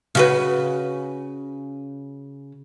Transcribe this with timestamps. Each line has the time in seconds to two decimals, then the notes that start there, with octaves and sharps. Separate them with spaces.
0.15 C#3 F#4 B4